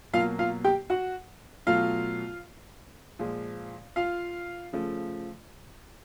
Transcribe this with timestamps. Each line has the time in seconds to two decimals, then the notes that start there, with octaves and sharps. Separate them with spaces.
0.13 B2 F#3 A#3 F4 F5
0.39 F4 F5
0.64 G4 G5
0.90 F#4 F#5
1.67 B2 F#3 A3 F4 F5
3.19 A#2 F3 G#3
3.96 F4 F5
4.73 C#3 F3 A3